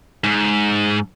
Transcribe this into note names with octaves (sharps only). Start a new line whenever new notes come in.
G#2